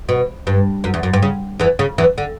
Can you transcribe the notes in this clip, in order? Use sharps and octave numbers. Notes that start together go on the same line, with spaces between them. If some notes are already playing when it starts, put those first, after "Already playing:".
B2
G2
F#2
E2
F#2
G2
C#3
E2 E3
C#3
E2 E3
D3